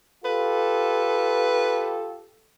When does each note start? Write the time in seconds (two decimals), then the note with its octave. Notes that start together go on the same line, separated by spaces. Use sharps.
0.25 F4 G4 A4 B4